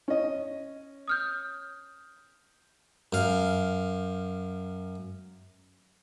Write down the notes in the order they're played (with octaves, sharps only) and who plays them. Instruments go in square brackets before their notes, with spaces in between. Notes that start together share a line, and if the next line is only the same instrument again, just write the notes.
[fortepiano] C#4 D#5
[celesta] D#6 F6 G6
[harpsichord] F#2 F5